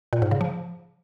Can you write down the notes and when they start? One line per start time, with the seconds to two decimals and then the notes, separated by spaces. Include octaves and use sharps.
0.13 A#2
0.22 G#2
0.31 C#3
0.41 F3